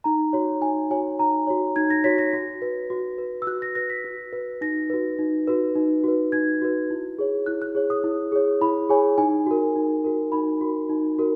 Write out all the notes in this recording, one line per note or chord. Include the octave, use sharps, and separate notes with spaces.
D#4 A#5
F#4 C#5
D#4 G#5
F#4 C#5 G#5
D#4 A#5
F#4 C#5
D#4 G#6
A#6
F#4 C#5 B6
A#6
F#4
B4
F#4
B4
E6
F#4 F#6
A#6
B4 A#6
B6
F#4
B4
D#4 A#6
F#4 B4
D#4
F#4 B4
D#4
F#4 B4
D#4 G#6
F#4 B4
E4
G#4 C#5
E4 F#6
F#6
G#4 C#5
D#6
E4
G#4 C#5
E4 B5
G#4 C#5 G#5
D#4 G#5
F#4 A#4
D#4
F#4 A#4
D#4 B5
F#4 A#4
D#4
F#4 A#4